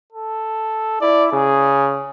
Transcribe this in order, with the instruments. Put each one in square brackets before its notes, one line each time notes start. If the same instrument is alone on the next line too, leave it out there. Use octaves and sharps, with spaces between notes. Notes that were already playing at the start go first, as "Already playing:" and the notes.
[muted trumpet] A4
[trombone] E4 [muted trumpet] D5
[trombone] C#3 [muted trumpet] G#4